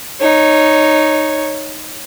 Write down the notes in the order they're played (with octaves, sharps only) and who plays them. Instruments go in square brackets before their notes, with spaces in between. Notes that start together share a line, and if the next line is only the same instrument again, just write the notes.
[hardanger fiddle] D#4 C#5